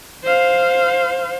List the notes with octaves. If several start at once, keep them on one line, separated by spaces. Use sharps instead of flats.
C5 F5